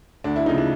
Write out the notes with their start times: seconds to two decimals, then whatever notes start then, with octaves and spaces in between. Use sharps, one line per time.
0.24 D2 D4
0.36 E4
0.46 C#3 F3 D#4
0.58 D4